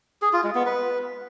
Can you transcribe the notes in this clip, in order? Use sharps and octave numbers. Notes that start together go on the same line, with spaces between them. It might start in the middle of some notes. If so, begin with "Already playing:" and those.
G#4
F4
G#3
B3
B4